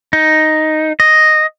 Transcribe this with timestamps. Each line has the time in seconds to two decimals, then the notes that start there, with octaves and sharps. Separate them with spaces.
0.13 D#4
1.00 D#5